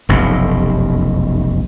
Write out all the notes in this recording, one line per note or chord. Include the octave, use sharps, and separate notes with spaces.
F1 B1 F#2